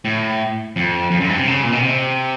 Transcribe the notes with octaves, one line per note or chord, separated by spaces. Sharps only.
A2
F2
F2
F#2
G2
C3
C#3
A#2
B2
C3